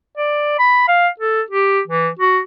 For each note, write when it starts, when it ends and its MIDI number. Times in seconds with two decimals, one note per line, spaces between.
0.17 0.56 74
0.59 0.87 83
0.88 1.08 77
1.19 1.41 69
1.50 1.80 67
1.87 2.09 52
2.19 2.39 66